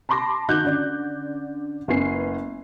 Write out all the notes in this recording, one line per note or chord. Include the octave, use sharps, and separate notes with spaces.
A5 B5 C6 D6 A#6
D#3 D#4 F#4 F#6 G6
D3 C#4 D5
F#1 B3 C#4 G#5 C7